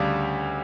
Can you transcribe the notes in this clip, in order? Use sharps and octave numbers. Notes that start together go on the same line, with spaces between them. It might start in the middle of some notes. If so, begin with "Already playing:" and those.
Already playing: D2 C#3 G3 D4